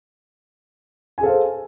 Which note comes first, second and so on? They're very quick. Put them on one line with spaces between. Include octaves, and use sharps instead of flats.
G#5 G#4 A4 F5 C5